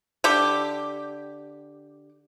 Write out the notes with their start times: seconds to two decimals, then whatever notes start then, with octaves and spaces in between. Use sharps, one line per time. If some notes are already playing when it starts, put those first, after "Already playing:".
0.24 D3 G4